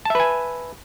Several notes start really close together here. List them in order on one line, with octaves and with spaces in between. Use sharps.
A5 E5 B4 G#5